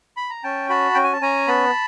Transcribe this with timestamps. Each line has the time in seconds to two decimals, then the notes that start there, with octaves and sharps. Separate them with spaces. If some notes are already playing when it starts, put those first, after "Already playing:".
0.17 B5
0.30 A#5
0.43 C#4 G5 A5
0.69 F#4 A5 B5
0.94 C#4 G5
1.04 G#5
1.13 A5
1.21 C#4 G#5 A#5
1.48 B3 A5 B5